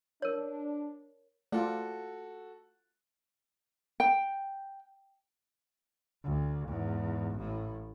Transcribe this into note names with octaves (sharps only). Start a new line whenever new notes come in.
D4 A#4 C#5
A3 F4 F#4 A4 D5
G5
D2
E2 G#2
A1 A2